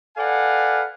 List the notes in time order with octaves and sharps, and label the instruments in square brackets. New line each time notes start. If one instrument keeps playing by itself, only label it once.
[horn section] A4 B4 D5 F5 F#5 G#5